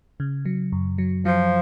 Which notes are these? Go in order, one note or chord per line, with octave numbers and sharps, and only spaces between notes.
C#3
F#3
F#2
F#3
F3 F#3